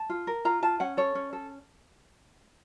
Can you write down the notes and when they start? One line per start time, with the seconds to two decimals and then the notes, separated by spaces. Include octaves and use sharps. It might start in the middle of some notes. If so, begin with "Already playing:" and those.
Already playing: A5
0.10 F4
0.27 A#4
0.45 F4 A#5
0.62 F4 A5
0.80 C#4 F#5
0.97 A4 C#5
1.15 C#4
1.33 A4